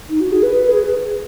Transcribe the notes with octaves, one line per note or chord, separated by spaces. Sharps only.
D#4
F#4
G#4
B4
G#4